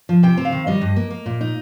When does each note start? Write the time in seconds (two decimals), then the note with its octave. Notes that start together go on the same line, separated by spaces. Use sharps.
0.09 F3
0.23 C3 G5
0.37 C4
0.45 F5
0.52 D#3
0.67 G3 D#5
0.81 G2
0.96 A#3
1.10 A#3
1.26 A#2
1.41 D#4